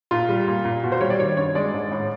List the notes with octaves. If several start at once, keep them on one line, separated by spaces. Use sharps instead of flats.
A#2 F4
G3
A#2
A#2
B2 F#4
C5
G3 C#5
D5
D#3 C#5
G2 C#5
G#3 D5
G#2
A2